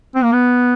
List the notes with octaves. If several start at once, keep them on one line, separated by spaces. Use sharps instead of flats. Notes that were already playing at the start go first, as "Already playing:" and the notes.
C4
A#3
B3